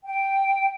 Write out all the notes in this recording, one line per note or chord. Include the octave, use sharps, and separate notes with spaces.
G5